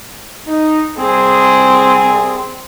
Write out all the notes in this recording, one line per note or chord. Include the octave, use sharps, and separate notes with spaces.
D#4
C2 C4 G#4